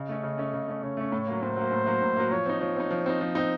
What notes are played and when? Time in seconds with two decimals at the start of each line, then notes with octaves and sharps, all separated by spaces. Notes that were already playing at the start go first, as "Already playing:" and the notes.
Already playing: C#3 D#5
0.09 A3 C#4
0.23 C#3
0.37 A3 C#4
0.53 C#3
0.68 A3 C#4
0.83 C#3 C#5
0.97 A3 C#4
1.12 A2
1.27 F#3 A#3
1.42 A2 C5
1.57 F#3 A#3
1.72 A2
1.86 F#3 A#3
2.02 A2
2.16 F#3 A#3
2.31 F3 C#5
2.46 C4 D#4
2.60 F3 C#5
2.76 C4 D#4
2.91 F3
3.06 C4 D#4
3.21 F3
3.35 C4 D#4